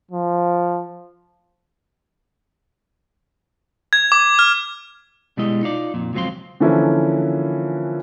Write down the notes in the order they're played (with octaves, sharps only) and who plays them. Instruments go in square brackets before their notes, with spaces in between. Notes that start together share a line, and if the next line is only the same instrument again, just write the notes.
[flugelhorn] F3
[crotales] G#6
D6
F6
[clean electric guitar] B2 G3 G#3 E4 D#5
D#4 F4 D5
F2 A#2
C#2 F3 F#3 C4 F5 C6
[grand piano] D3 E3 F3 A#3 C#4 E4